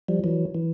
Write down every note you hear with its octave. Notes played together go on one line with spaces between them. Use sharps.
F3 G3
E3 F#3
E3